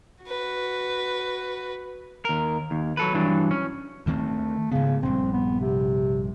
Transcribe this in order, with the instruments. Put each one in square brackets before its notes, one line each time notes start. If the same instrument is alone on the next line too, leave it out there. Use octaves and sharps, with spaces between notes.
[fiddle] F#4 B4
[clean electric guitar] D#2 A#4
D#2
F#3 A4 B4
G2 E3 F#3 D4
C#4
[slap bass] D2 D#3 C4 [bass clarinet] A3
[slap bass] G#2 B3 [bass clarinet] C#3
[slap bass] A#1 G2 [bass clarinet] C4
[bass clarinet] B3
C3